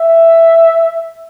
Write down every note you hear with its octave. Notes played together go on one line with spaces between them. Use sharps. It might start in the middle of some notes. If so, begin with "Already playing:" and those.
Already playing: E5